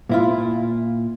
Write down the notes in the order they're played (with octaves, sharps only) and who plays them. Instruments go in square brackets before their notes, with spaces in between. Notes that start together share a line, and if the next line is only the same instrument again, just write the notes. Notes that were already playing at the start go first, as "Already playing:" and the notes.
[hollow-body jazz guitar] A#2 E4 F4